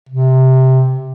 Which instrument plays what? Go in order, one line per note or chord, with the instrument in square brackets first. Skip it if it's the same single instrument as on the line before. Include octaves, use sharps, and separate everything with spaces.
[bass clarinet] C3